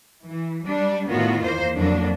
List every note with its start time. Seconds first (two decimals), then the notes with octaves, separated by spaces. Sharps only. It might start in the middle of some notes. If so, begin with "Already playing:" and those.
0.24 E3
0.65 G3 D4
1.10 A2 D#3 B3 F4 F#4
1.43 E2 A#3 C5
1.75 F2 D3 F#3 A#3 D4